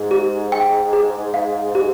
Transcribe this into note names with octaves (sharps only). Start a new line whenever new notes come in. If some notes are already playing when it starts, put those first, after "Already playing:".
Already playing: G#2
G4
G5
G#4
F5
G4